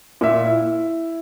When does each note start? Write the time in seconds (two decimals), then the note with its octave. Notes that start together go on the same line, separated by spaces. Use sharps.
0.21 A#2 E5
0.46 E4